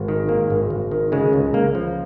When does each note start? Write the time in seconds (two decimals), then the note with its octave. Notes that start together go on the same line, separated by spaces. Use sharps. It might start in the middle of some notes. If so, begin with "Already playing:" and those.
Already playing: G#1
0.08 D#3
0.29 G#2 A#3
0.50 G#1
0.70 G#1
0.92 D#3
1.12 C#3 G#3
1.33 C#2
1.54 C#2 A#3
1.75 F3